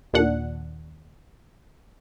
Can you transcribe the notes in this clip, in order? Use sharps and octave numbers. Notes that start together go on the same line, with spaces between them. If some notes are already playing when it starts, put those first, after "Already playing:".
D#2 A#2 D4 F#5